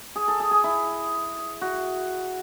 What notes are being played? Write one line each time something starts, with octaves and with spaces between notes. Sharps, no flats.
G#4
A4
G#4
G#4
E4
F#4